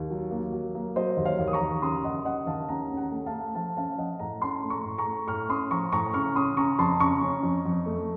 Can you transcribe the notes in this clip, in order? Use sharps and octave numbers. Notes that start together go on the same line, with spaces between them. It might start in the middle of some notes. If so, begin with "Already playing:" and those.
Already playing: D#2
F#3
A#3
F#3
A#3
F#3 C5 D#5
D#2
C#5 F5
D#2
D#6
A#5 C#6
D#2
C#3 C6 D#6
D#2 D#5 F#5
C#3 D#5 F#5
D#2 F5 A5
C#4 F#5 A#5
C#4
F#5 A#5
A3
F5 A5
A3
F3 F5 A5
C#4 F5 A5
F3 D#5 F#5
A2 F#5 A#5
C#4 A5 C6
A3
A#5 C#6
A2
A#5 C#6
A3
A2 C#6 F6
C#4 C6 D#6
F3 A#5 C#6
A2 A#5 C#6
C#3 C#6 F6
C#4 C6 D#6
C#3 A#5 C#6
F2 A5 C6
C#3 A#5 C#6
C#4
F2
F2
A3